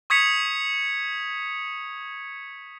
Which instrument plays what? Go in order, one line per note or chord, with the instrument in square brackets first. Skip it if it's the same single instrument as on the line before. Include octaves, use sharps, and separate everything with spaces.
[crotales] C#6 D#6 G#6 B6 C#7 F7